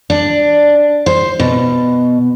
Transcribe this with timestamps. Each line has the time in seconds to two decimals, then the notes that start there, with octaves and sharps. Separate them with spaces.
0.10 D4
1.06 C5
1.40 B2